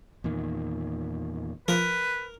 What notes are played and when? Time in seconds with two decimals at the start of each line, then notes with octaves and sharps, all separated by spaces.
0.24 E2 A#2 D#3
1.68 F3 A#4 B4